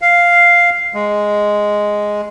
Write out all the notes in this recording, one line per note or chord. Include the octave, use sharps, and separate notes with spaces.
F5
G#3